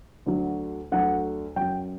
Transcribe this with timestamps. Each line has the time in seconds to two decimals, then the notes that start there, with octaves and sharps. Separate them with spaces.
0.26 D2 D3 F#3
0.92 D2 D3 F#3 F#5
1.56 F#2 F#3 G5